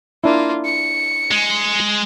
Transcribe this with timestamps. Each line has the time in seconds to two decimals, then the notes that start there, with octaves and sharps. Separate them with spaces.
0.24 A#3 D4 E4 F4
0.65 C#7
1.31 G#3